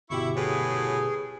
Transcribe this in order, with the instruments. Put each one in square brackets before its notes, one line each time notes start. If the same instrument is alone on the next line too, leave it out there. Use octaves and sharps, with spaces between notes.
[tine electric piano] G1 B2 G4 [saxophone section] E4 [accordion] C#6
[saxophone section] A2 F#3 B4 [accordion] G#4